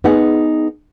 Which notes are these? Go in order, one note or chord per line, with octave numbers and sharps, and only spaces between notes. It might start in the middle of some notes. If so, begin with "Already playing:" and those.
B3 D#4 G#4 F#5